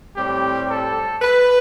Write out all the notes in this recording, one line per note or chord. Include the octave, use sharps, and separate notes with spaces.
A2 G3 C4 G4
A4
B4